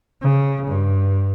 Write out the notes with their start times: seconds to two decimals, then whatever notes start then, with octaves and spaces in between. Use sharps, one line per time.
0.21 C#3
0.68 G2